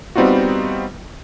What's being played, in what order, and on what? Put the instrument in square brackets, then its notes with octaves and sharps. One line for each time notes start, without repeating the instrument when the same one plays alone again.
[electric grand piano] G3 B3 C4 D#4 F4 F#4